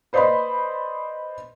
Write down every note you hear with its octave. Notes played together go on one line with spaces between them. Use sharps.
B4 C5 D5 D#5 B5 C6